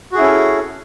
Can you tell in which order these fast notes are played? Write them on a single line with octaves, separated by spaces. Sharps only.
F#4 G#4 E4 C#4 A4